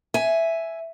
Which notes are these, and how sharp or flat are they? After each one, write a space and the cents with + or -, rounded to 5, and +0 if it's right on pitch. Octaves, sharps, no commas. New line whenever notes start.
E5 +0 G#5 +5